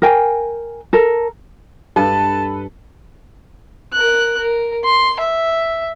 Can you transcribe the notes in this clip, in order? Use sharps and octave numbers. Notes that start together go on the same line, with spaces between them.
A#4 G5 G#5
A4 A#4
G2 A4 B4 A5
A#4 F#6
A#4
C6
E5